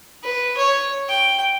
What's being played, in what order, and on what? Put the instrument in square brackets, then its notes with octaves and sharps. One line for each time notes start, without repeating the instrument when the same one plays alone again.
[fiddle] B4
C#5
G5